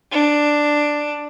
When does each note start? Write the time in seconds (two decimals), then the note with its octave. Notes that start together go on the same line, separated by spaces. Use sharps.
0.12 D4